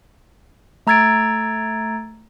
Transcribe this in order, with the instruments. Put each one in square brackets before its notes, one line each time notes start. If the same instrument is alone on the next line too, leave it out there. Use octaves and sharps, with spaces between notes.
[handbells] A3 A#5 E6 G#6 A6 D7